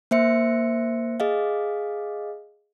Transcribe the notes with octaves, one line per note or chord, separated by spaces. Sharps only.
A#3 C5 E5 C#7
G#4 D#5 F5